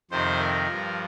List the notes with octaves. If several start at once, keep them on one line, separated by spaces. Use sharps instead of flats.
F2 C3 D#3 C5
A#4
G2 F3